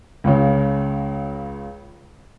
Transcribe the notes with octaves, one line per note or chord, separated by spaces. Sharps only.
C#2 C#3